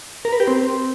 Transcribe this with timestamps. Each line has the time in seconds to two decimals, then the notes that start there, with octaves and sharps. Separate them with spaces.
0.25 A#4
0.32 B4
0.40 G4
0.48 C4